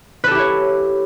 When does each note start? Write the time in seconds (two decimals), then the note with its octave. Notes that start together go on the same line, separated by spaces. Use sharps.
0.24 B4
0.27 A4
0.31 G4
0.35 E4
0.39 C#5